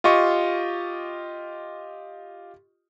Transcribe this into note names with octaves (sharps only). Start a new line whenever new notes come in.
F4 G4 D#5 C#6